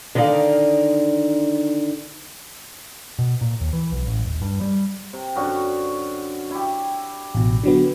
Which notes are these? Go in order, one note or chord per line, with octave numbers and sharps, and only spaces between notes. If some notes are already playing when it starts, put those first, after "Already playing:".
D3 D#3 D#4 D5 F5
B2
A#2
D#2
E3
B1
A1
D#1
G2
G3
C3
F#2 D3 F#4
E4 G4
A1 B2
D3 F#3 B3